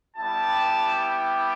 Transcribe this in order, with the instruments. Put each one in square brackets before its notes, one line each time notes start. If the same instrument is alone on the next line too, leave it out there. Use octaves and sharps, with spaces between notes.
[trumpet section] G3 B3 E4 G4 A5